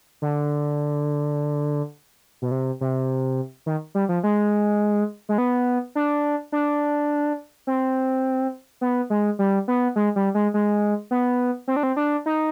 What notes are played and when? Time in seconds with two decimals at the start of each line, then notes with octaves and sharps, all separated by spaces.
0.22 D3
2.42 B2
2.51 C3
2.81 C3
3.66 D#3
3.95 G3
4.09 F3
4.23 G#3
5.29 G#3
5.38 B3
5.95 D4
6.52 D4
7.67 C4
8.81 B3
9.10 G#3
9.39 G3
9.68 B3
9.96 G#3
10.16 G3
10.35 G#3
10.54 G#3
11.11 B3
11.68 C4
11.76 D4
11.83 C4
11.97 D4
12.26 D#4